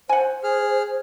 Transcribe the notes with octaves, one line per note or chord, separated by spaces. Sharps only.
C5 F#5 G#5
G#4 F6